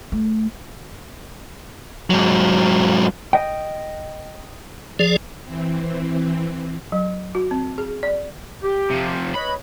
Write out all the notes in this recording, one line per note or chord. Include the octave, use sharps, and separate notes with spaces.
A3
G#2 F#3
D#5 G5
F3 G#4 D5
E3 C4
F#3
F#4
C4
G#4
D5
G4
C3 F3
B4 C#5 D#5 B5